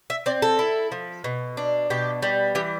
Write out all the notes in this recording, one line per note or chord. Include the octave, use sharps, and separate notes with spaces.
E5
C4 D5
A4
E4
F3
B2
D4
B2 G4
G3
E3 G4